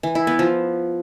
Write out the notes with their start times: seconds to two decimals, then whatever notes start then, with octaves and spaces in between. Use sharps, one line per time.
0.03 E3
0.15 E4
0.27 B3
0.39 F3